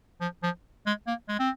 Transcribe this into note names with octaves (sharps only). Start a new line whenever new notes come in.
F3
F3
G#3
A#3
G#3
C4